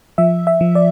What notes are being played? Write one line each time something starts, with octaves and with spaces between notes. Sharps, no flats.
F3 E5
E5
F3
D5